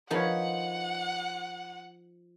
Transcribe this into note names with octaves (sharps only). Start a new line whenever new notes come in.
F3 D#4 A#4 B4 C#5 F#5